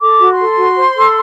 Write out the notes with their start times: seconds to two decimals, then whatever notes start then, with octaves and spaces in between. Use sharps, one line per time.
0.01 A4 D6
0.20 F#4
0.30 C6
0.39 A4
0.58 F#4
0.76 C5
0.96 A4